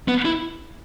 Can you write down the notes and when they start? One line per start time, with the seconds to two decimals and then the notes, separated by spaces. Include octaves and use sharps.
0.08 B3
0.25 E4